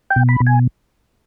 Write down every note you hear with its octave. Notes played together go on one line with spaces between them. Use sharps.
G5
B2
B5
B2
G#5